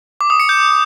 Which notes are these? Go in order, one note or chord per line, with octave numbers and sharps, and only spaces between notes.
D6
D#6
C#7
G6